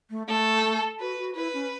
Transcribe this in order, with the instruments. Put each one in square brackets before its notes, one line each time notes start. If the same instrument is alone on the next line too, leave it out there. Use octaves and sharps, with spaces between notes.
[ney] A3
[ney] A3 [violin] A4
[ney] F#4 [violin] B4
[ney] F#4
[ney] E4 [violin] B4
[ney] C#4